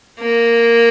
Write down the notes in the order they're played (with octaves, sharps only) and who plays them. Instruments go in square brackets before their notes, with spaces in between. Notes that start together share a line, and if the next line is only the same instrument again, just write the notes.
[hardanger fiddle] A#3